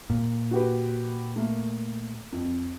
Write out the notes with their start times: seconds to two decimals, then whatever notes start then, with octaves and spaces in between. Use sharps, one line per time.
0.10 A#2
0.51 F#4 G4 B4
1.36 A3 A#3
2.32 F2